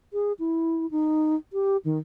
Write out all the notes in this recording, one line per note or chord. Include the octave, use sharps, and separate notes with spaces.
G#4
E4
D#4
G4
D#3